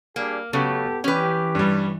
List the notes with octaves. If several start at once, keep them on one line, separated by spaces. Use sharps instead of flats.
G3 A#3 D4 G#4
C#3 F#3 A3 B3 G4 A4
E3 C#4 G4 B4
G2 G3